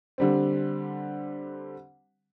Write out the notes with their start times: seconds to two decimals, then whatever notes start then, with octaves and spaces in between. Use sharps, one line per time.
0.18 D3 G3 C4